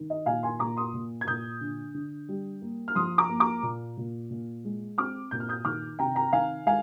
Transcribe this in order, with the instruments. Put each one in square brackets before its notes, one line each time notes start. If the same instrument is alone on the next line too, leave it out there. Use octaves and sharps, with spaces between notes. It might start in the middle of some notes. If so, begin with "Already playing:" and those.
Already playing: [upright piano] D#3
D#5
A#2 F5 G#5
G#5 C6
A#2 A#5 D6
C6 D#6
A#2
G#6
A#2 D#6 G6
D3
D3
G3
A#3
F6
F3 C6 D#6
A#5 D6
A#3
A#5 D6
A#2
A#2
A#2
G#3
C4 D6 F6
A#2 G6
F6
D#6 G6
D#3 D6 F6
C3 G5 A#5
G5 A#5
D#3 F5 G#5
G#3 F5 G#5